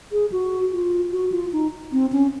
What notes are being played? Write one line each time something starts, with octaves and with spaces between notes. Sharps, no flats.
G#4
F#4
F4
F#4
F4
D#4
C4
C#4